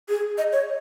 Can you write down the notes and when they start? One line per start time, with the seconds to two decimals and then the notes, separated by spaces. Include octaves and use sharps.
0.09 G#4
0.38 D#5
0.52 C#5